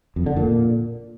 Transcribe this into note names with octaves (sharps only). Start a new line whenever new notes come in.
F2
D3
A#2